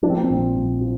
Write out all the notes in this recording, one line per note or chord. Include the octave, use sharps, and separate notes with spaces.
F3 D4
C4
A#3
C4
A#1
A#1
F3